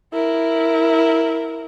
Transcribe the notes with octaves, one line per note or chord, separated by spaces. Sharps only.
E4 A#4